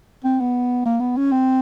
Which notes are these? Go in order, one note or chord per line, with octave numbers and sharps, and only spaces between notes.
C4
B3
A#3
B3
C#4
C4